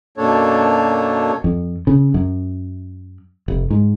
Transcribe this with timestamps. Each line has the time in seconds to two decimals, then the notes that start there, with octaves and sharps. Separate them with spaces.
0.17 F#2 B2 A#3 D4 A4 C#5
1.44 F2
1.87 C#3
2.14 F#2
3.48 F1
3.71 G#2